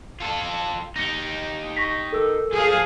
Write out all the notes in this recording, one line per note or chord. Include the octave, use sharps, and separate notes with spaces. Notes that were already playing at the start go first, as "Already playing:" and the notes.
F4 A4
D#4 G4 A#6 C#7
C#6 A#6 B6
A4 A#4 E6
F3 G#4 F5